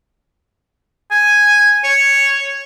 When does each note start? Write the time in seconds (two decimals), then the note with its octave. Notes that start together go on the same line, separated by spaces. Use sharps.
1.11 G#5
1.84 C#5